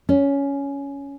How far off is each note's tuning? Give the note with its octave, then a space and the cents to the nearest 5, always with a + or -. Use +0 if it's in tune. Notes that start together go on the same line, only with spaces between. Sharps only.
C#4 +10